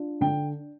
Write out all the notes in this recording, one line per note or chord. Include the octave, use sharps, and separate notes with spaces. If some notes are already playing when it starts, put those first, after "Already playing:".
Already playing: D4 F4
D3 G5